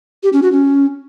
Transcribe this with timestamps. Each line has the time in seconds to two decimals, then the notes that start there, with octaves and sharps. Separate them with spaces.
0.23 G4
0.33 C#4
0.42 F#4
0.52 C#4